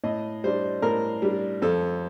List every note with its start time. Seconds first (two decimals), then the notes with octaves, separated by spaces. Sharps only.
0.04 A2 D#5
0.44 G3 D4 C5
0.82 A2 A#4
1.22 G3 D4
1.62 F2 A4